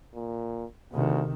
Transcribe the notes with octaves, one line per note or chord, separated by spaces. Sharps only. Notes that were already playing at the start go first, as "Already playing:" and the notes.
A#2
D2 C3 D#3